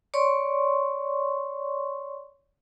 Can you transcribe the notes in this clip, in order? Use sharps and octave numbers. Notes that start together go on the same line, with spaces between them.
C#5 D5 C6 C#6